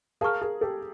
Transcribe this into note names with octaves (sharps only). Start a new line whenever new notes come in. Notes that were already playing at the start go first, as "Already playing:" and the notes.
G#4 A#4 F5 A5 C#6 F6
G#4 A#4
G4 A4